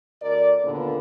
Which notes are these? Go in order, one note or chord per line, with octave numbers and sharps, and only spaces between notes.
D2 A#4 D5
D#2 A#2 D3 B3 A#4